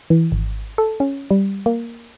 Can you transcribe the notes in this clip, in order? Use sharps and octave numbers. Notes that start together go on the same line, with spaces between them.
E3
G#1
A4
C#4
G3
A#3